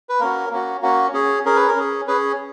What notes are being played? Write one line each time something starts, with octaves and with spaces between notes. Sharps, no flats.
B4
A#3 C#4 F#4 A#4
A#3 C#4 F#4
A#3 C#4 F#4
C#4 G#4
C#4 G#4 A#4
B4
A#4
C#4 G#4
C#4 G#4 B4